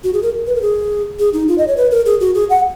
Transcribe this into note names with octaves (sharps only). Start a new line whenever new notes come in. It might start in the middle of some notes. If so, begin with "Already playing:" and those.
F#4
G#4
A#4
B4
A#4
G#4
G#4
D#4
F4
D#5
C#5
B4
A#4
G#4
F#4
G#4
F#5